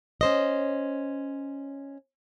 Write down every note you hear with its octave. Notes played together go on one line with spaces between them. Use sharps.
C#4 C5 D#5